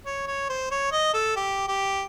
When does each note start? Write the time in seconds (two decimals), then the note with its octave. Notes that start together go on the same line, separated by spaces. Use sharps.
0.06 C#5
0.27 C#5
0.49 C5
0.71 C#5
0.92 D#5
1.13 A4
1.36 G4
1.68 G4